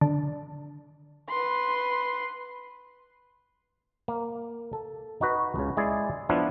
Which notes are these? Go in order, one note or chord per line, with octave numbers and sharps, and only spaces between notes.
D3
B4 C6
A#3
A4
D#4 F#4 B4
C#2 C#3
G#3 E4 G#4 D5
F3 B3 D4 E4 F4